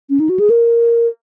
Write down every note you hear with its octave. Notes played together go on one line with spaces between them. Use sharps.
C#4
D#4
F#4
G#4
A#4